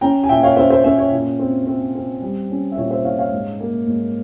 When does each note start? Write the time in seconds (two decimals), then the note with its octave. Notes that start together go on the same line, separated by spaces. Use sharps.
0.01 C#4 G5 A#5
0.24 G#5
0.29 A#2 E5 G5
0.43 C#5 F5
0.57 C#4 C5 E5
0.70 C5 E5
0.84 C#4 C5 E5
0.98 C#5
1.12 A#2
1.39 C4
1.67 C4
1.95 C4
2.22 G3
2.50 C#4
2.72 E5
2.78 A#2 C#5
2.91 C5 E5
3.05 A#2 C#5 F5
3.18 C#5 F5
3.32 G#2
3.60 A#3
3.87 G#2